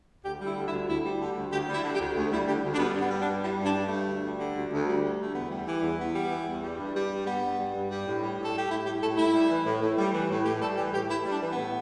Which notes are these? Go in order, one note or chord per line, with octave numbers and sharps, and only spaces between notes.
D2 G4
G3
E4
D3
E4
D2
D2 E4
G3
D3 G4
D2
D2 G4
G3
E4
D3
G4
D2
D2
G3 E4
D3 G4
D2
D4
G3 B3
G2
B3
G3
D4
G2
G3 E4
G2 D4
G3
A3
G2
D2
G3
D3
D2
D2
G3
D3
D2 A3
E2 B3
G3
E3
E2
E2 B3
G3
E3
E2
G3
G2
G3
G2
G3 B3
G2
G3
G2
G3
A2
G3
A2
A4
G3 G4
A2 E4
G3 G4
A2 A4
A2 E4
G3
E3
A2
A2
G3
E3
A2
A2 G4
G3 A4
E3 G4
A2 G4
A2 E4
G3
D4
E3
B3
A2